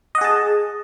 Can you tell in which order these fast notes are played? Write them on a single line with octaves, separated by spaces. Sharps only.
D#5 F#5 G#4 A5